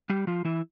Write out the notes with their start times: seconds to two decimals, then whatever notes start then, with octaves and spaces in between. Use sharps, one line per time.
0.10 G3 G4
0.27 F3 F4
0.45 E3 E4